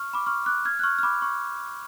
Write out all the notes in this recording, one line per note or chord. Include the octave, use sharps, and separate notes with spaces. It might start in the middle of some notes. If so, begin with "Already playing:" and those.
Already playing: C#6 F6
B5 D6
C#6 F6
D6 F#6
F6 G#6
F#6
C#6 F6
F6
B5 D6
C#6